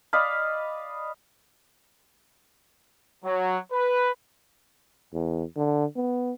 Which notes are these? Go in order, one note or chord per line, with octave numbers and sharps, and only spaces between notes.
D5 D#5 F5 B5
F#3
B4
E2
D3
B3